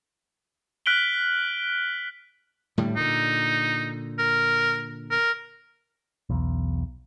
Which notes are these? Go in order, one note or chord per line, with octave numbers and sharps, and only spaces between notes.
F6 F#6 B6 D7 F#7 G7
A2 D3 G3
A#2 D3 D#4
A#4
A#4
B1 E2